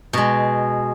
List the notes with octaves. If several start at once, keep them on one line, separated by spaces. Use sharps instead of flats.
B2 G#3